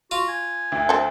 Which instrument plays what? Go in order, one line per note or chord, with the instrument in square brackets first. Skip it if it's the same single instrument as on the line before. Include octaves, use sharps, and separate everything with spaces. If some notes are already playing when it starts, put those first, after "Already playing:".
[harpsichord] F4 [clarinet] F#4
[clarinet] G#5
[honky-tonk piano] D2
[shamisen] C4 A4